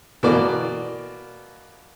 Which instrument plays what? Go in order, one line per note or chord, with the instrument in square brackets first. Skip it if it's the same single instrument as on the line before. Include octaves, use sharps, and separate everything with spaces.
[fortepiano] B2 E3 A#3 D5 D6